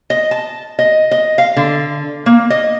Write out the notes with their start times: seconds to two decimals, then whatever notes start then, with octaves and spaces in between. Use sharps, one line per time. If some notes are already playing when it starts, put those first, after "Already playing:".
0.10 D#5
0.31 A5
0.79 D#5
1.11 D#5
1.38 F5
1.57 D3
2.26 A#3
2.50 D#5